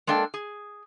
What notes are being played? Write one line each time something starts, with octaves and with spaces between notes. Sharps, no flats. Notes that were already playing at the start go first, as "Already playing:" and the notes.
G#3 A#3 D4 A4 G5
G#4